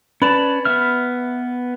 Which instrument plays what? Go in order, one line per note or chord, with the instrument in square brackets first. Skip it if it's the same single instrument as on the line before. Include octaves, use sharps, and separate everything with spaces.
[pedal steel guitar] C#4 D5 A5 [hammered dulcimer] B4
[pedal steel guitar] B3 E5 F6